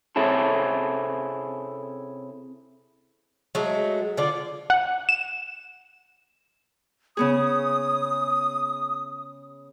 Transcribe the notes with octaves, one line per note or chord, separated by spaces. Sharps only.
C3 C4 C#4 E4 G#4 A4
F#3 G#3 A3
D3 F4 D5
F#5
E7
C#3 B3 G#4 D#6